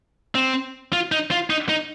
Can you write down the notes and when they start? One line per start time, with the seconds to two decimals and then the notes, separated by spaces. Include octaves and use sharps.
0.35 C4
0.93 F4
1.12 D#4
1.31 F4
1.50 D#4
1.69 D#4